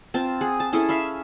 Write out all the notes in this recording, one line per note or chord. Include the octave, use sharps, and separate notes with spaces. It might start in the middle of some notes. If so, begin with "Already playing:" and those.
C4 F4 A5
G#4 F#5
A5
C#4 E4 G#4 A4
E5 F5 B5